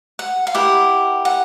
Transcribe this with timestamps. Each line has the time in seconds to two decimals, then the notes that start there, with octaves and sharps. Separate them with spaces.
0.19 F#5
0.47 F5
0.55 E4 G4 A#4 F#5
1.25 F#5